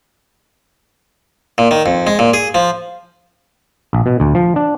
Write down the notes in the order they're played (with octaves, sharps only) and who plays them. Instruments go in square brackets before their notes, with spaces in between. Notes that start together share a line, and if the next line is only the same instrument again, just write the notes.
[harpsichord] A#2
D#3
F2
G#3
A#2
G#4
F3
[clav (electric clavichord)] A#1
B2
D2
F3
D4